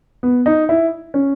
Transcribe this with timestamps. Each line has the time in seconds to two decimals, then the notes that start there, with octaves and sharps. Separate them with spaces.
0.23 B3
0.46 D#4
0.69 E4
1.14 C#4